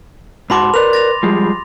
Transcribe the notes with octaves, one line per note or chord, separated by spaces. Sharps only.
G#2 F#4 A5 B5 C6 D6
A#4 B4 D5 F7
A6 A#6 F7
F3 G3 G#3